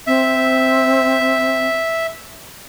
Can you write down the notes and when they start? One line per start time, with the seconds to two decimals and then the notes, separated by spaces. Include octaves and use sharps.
0.07 C4 E5